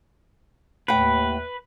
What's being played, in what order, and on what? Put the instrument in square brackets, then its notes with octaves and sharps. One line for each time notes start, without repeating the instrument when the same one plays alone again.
[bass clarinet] D#2 [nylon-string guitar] A2 F#5 G5 [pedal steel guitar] B4